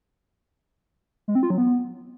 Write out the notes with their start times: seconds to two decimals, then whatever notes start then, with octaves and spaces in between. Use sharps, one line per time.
1.28 G#3
1.35 C4
1.43 F4
1.50 F#3
1.58 B3